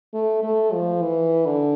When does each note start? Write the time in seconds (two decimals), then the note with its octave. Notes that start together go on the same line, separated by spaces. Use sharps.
0.14 A3
0.43 A3
0.73 F3
1.02 E3
1.46 D3